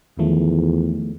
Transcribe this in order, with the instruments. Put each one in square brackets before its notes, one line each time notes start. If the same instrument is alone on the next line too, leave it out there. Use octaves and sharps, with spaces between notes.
[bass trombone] E2 [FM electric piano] D#3 F3 A3